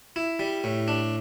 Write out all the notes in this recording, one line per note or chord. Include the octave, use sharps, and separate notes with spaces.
E4
G3
A2
D4